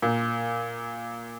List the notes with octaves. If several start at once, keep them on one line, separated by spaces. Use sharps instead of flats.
A#2